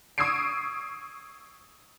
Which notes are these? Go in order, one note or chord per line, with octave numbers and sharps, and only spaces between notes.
C#6 D#6 E6 G#6 C7 D7